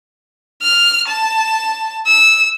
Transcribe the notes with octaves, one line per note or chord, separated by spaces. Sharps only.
F6
A5
E6